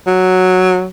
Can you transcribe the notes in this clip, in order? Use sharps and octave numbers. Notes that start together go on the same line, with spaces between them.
F#3